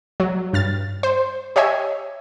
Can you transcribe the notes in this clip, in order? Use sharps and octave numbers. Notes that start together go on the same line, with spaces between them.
F#3
G2 F6 A6
C5
G4 C#5 D#5 E5 G#5